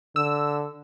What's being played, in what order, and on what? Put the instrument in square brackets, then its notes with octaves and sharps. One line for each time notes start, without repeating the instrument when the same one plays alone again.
[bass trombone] D3 [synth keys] E6